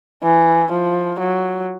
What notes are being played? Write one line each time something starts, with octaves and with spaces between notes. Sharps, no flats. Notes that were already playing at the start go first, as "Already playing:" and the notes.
E3
F3
F#3